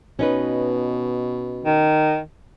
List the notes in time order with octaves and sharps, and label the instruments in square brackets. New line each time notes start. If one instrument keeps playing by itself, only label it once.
[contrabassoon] B2 [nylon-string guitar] C#4 D#4 B4
[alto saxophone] D#3